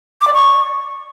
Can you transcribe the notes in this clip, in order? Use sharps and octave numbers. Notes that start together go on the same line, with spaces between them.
D6
D5
C#6